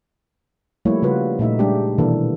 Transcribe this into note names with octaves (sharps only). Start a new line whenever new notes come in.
F3 G3 A3 A#3 E4 C#5
C#3 G3 F4 F#4 B4
A#2 A3 D#4 E5
G3 G#3 D4 G4
B2 D#3 E3 A#3 D4 A4